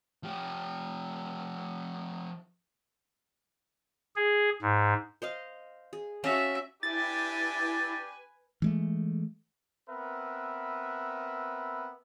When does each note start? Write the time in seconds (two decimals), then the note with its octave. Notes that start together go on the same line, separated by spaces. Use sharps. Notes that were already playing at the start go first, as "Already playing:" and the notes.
0.23 F3 G4
4.16 G#4
4.62 G#2
5.22 C5 D#5 F5
5.93 G#4
6.24 C#4 F#4 E5 F5 A5
6.83 D4 E4 G4 B4 G#5 A6
8.62 E3 G#3 A3
9.89 B3 C4 A#4 B4 E5